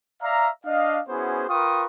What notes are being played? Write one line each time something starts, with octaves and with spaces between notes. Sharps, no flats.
D5 E5 F5 A#5
D4 D#5 F5
B3 C#4 E4 F#4 G#4 C5
F4 A#4 B4 G5 C#6 D#6